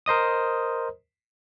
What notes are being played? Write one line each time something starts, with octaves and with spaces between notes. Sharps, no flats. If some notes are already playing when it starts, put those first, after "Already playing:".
A#4 C5 D#5 D#6